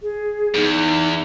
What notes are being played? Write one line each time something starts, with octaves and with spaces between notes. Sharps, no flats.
G#4
E2 D#4